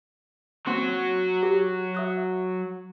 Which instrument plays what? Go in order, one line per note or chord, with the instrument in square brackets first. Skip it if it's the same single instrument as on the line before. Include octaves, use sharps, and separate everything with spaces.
[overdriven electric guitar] F#3 F#4 [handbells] A#3 C4 C6
[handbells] G4
E5 D#6 F#6